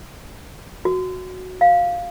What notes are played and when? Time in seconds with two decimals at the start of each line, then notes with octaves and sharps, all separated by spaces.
0.85 F#4
1.61 F5